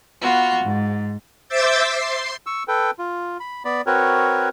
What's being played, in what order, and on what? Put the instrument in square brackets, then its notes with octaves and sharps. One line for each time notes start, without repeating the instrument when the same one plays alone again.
[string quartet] B3 F4 F#4
G#2
[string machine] C5 E5 D6 E6 G6 A6
C6
[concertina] C#6 E6
A4 B4 G5
F4
B5
B3 D5 B5
C4 F#4 A#4 B4 C#5